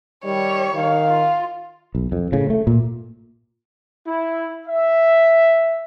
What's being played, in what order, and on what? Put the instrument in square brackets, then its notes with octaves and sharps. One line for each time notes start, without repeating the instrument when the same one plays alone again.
[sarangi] D#3 [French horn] G3 [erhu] C#5
[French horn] D#3 [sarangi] F5
[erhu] F4
[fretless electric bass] B1
F2
A2 C#3
A3
A#2
[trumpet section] E4
E5